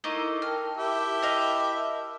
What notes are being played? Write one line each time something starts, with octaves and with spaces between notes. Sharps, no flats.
A3 A#3 D#4 E4 A#4 D#5
A#4 G5 A5 F6
E4 G4 E5
D#5 F5